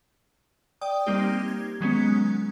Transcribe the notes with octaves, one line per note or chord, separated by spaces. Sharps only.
D5 G5 D#6
G3 A#3 C4 D#4 G4
G#6
D#3 F#3 G#3 B3 C#4